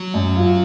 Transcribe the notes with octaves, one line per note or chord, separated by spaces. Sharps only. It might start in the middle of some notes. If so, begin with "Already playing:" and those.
Already playing: F#3
F#2
F4